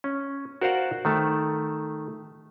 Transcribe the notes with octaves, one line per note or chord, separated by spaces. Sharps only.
C#4
F#4 A#4 C5 D5 F5 F#5
D#3 A3 A5